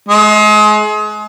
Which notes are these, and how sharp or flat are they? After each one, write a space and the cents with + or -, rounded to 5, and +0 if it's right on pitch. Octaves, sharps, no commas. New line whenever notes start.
G#3 +35